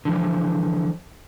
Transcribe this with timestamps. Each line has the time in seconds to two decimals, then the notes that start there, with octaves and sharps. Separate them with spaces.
0.05 D3 E3 F3